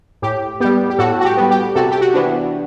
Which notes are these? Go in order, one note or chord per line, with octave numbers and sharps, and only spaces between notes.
A2 G4
G3 B3 G4
G4
A2 F#4 A4
F#4
G4
G3 B3
G4
C3 F#4 A4
G4
F#4
E3 B3 D4